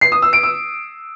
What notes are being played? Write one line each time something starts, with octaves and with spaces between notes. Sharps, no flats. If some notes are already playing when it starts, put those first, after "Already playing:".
C7
D#6
E6
D7
E6